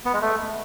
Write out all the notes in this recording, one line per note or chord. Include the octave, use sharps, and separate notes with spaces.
B3
G#3
A3